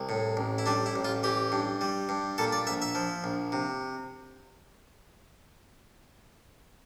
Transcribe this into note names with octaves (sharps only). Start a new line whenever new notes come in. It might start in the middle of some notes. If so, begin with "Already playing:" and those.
Already playing: C2
A2
A1
E4
G3 D4
E4
A1
F4
E3 G4
G2
G3
G2
A#2 A4
D5
A#1 E5
E5
F3
A#1
C3